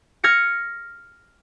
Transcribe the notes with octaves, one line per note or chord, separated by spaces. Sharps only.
F6 G#6 A#6 C#7